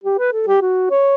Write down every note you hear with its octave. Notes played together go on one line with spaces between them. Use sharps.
G4
B4
A4
G4
F#4
C#5